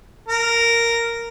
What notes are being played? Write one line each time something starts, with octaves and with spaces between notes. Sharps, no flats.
A#4